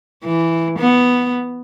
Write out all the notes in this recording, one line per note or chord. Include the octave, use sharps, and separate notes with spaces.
E3
B3